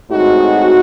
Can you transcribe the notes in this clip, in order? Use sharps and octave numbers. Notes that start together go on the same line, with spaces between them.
A2 G#3 C4 D#4 F#4